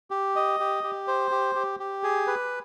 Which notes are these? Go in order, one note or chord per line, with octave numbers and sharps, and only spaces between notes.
G4
D#5
G4
G4
C5
G4
G4
G4
G#4
B4